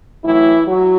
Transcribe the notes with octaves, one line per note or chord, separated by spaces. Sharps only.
A2 E3 F#3 A3 E4
F#3 F#4